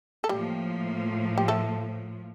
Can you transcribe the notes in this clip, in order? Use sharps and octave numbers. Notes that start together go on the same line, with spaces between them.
A4
A2 F3 G3 A#3 G4
G4
A3 A4